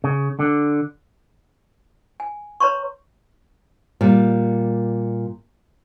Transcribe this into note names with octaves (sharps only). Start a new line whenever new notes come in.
C#3
D3
G#5
B4 C#5 A#5 C6 C#6
A#2 G3